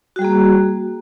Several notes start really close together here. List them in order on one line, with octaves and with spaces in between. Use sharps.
F#4 G3 G#4 A#3